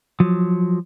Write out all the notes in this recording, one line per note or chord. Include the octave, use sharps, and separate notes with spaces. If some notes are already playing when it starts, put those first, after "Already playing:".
F3 F#3